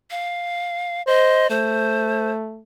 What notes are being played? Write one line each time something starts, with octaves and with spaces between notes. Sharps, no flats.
F5
C5 D#5
A3 C5